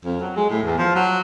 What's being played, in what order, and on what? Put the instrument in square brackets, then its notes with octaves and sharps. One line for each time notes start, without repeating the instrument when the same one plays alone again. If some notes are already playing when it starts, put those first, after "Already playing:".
[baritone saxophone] F2
F#3
G#3
A2
E2
F3
F#3